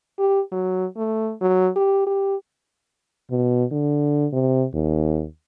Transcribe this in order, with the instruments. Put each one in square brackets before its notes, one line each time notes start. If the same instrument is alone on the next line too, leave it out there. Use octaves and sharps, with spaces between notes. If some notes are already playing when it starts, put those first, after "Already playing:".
[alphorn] G4
F#3
A3
F#3
G4
G4
[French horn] B2
D3
C3
D#2